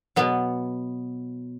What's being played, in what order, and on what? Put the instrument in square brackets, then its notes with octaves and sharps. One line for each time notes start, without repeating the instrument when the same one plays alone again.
[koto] B2 F#3 B3